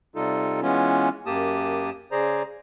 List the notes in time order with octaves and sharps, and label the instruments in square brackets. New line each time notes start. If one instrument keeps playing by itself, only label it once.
[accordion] C3 G3 D#4 F4 A4
E3 G#3 B3 C#4 F4
F#2 A#3 G4 A5 D#6
C#3 G#4 C5 D5 A#5